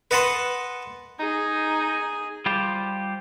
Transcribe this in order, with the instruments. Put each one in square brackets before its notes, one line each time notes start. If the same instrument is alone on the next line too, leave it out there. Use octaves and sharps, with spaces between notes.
[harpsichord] B4 D#5 F#5 A5 B5 C6
[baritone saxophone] D#4 [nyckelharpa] G#4 G#5
[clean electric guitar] G3 F4 G4 C5